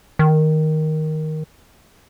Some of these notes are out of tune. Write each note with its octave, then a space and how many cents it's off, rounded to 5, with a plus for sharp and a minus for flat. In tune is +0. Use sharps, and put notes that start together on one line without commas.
D#3 +5